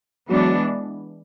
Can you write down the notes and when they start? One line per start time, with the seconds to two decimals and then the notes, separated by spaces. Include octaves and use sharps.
0.29 E3 F#3 G#3 B3 D4